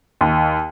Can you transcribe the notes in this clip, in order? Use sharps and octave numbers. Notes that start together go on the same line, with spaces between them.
D#2